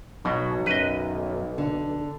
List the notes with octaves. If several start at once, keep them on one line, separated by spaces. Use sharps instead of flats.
B1 B2 F#3
F#2 B4 D#5
D3